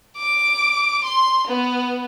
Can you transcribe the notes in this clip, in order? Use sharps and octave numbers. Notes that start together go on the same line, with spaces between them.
D6
C6
B3